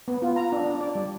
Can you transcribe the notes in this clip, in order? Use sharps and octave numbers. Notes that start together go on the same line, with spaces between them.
B3
F4
A#5
D4
D4
D5
G3